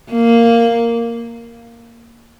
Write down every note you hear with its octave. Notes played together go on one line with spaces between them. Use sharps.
A#3